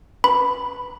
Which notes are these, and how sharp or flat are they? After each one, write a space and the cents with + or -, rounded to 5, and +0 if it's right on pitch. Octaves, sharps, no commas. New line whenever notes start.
B4 +0 B5 +5